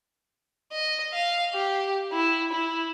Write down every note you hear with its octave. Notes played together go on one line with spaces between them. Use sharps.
D#5
F5
G4
E4
E4